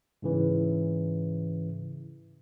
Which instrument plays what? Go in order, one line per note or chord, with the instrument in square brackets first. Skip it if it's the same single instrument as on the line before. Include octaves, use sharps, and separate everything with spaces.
[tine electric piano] G#2 C#3 E3